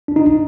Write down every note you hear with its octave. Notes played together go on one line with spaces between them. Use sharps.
D4
D#4